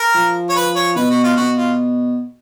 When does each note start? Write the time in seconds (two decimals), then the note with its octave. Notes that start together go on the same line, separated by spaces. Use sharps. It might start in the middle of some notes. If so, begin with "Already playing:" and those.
Already playing: A#4
0.15 F3
0.49 C#5
0.56 B4
0.76 C#5
0.96 B2 B4
1.10 F#4
1.24 F4
1.36 B2 F#4
1.57 F4